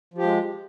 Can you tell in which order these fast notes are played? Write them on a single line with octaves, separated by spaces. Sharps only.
F3 G4 G#3